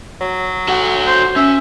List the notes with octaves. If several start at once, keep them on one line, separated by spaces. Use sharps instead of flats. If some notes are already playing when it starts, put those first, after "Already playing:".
F#3
F#4 A4 F#5
C5
C#4 E5